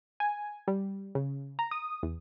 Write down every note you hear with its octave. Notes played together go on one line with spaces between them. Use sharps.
G#5
G3
C#3
A#5
D#6
E2